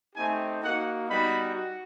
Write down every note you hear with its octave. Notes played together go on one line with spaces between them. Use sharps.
A3 C4 D#4 G4 G#5
A#3 D#4 F#4 F#5
G3 B3 D#4 F#4 B5
F#4